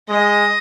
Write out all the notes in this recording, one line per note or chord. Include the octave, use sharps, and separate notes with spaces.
G#3 D#5